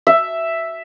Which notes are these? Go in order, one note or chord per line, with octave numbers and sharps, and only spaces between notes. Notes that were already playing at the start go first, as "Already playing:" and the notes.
E5